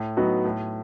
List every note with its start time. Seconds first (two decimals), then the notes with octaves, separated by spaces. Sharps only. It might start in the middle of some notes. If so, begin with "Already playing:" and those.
Already playing: A2
0.17 F#3 B3 D#4 F#4
0.45 A2